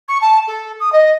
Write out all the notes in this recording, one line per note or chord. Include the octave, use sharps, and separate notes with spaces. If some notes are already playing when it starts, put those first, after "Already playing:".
C#6
A5
A4
D#6
D#5